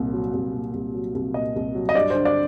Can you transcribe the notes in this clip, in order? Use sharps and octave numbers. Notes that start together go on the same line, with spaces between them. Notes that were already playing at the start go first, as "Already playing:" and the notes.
Already playing: C2 A#2
F#3
C2
A#2
C2
F#3
C2
A#2 D#5
C2
F#3
D#5
G2 D5
D3 C5
D5